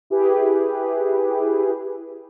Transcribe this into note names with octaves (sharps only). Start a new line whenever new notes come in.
E4 G4 G#4 B4